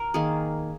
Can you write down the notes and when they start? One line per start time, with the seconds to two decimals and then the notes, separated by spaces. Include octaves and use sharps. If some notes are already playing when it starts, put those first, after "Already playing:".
Already playing: A#4
0.14 D#3 A#3 G#4